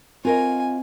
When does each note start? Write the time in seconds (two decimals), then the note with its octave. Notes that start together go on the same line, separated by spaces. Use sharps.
0.25 C4 F4 A#4 D#5 G#5